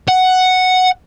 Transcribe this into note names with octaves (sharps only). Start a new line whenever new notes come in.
F#5